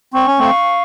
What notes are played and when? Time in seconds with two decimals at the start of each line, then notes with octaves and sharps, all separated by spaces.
0.13 C4 C#6
0.26 C#4
0.39 A3 C4
0.45 F5